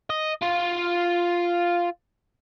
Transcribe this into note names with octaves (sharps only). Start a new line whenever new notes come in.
D#5
F4